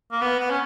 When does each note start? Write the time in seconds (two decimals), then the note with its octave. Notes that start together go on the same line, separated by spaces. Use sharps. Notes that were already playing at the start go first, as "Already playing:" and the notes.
0.12 A#3
0.22 B3
0.40 B3
0.50 C#4